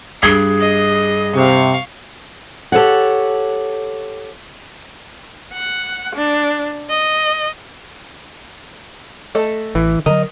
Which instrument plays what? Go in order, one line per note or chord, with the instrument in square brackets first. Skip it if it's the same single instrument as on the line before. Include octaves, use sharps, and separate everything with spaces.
[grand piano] G2 G#6 G7 [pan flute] G#4
[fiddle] D#5
[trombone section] C3 [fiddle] F5 C#6
[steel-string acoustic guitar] G4 A4 B4 C#5 F#5
[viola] F#5
D4
D#5
[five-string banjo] A3 A4 D#5
[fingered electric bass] A1 [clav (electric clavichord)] E3
[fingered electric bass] D3 D#3 F#3 [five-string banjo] A#4 [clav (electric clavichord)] D#5